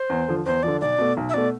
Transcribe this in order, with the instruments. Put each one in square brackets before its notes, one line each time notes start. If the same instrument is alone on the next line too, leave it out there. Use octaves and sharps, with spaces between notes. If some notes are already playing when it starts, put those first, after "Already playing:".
Already playing: [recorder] C5
[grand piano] E2
D3 F3
[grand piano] E2 [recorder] C5
[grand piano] D3 F3 [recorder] D5
[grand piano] B1 [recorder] D5
[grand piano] B2 A3
B1
[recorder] E5
[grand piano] B2 A3 [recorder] D5